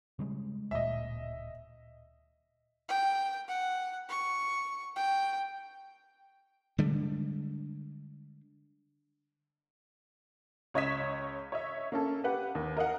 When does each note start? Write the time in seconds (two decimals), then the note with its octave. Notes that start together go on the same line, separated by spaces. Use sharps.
0.19 C#3 G3 G#3
0.71 D1 A#2 D#5 E5
2.89 G5
3.48 F#5
4.09 C#6
4.96 G5
6.78 D3 G3 G#3
10.74 C#2 C#5 D#5 G#6 B6 E7
11.52 C#5 D#5 E5
11.92 A#3 C#4 A4
12.24 G4 B4 F#5
12.55 D#2
12.77 A#4 D#5 F5 F#5